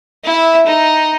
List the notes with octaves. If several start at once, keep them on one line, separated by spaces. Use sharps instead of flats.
E4 E5
D#4